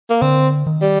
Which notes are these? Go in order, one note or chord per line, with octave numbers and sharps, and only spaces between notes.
A#3
D3 C4
D#3
G3